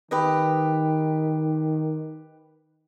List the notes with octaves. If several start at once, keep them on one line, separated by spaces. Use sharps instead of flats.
D#3 G4 B4 D#5